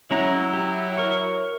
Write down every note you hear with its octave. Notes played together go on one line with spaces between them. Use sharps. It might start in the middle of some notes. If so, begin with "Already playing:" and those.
F#3 G#3 C#4 E4 A#5
G4
A#4 C#5